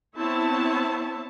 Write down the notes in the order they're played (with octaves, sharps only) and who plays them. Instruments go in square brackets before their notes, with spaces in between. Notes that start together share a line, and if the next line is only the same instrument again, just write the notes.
[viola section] B3 C4 E4 C#5 E5 A5